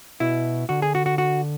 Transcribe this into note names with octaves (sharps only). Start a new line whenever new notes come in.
B2 E4
D3 F#4
G#4
F#4
F#4
F#4